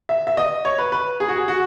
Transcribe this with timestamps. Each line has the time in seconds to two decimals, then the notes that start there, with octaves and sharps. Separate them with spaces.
0.09 E5
0.27 E5
0.37 D#5
0.65 C#5
0.78 B4
0.92 B4
1.20 G#4
1.28 F#4
1.36 G#4
1.48 F#4